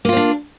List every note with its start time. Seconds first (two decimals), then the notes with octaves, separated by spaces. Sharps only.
0.05 A#3
0.09 F4
0.13 C4
0.17 D4